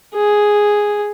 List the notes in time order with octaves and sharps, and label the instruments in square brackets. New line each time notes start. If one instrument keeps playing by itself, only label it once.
[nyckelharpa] G#4